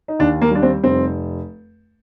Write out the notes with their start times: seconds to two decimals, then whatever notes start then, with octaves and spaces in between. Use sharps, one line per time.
0.08 D#4
0.19 D#2 D4
0.41 A#3
0.51 G3 D4
0.63 C4
0.84 F1 C4